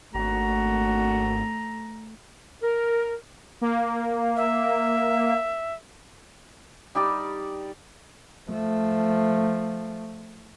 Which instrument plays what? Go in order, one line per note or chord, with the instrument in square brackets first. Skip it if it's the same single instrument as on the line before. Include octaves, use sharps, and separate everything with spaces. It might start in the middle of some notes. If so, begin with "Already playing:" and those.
[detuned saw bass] G#1 [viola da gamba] A3 [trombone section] A#3 D4 F#4 [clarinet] A#5
[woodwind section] A#4
[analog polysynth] A#3
[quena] E5
[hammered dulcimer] G3 D#4 G4 D5
[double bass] F3 A3